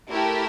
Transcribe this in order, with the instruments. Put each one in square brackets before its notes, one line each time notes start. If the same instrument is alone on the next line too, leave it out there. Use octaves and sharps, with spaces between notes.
[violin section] A3 E4 G4 A#4